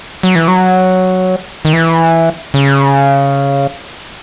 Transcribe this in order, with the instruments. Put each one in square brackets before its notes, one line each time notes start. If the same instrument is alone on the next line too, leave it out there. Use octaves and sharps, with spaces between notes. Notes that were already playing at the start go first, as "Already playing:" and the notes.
[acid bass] F#3
E3
F#3
D#3
E3
C#3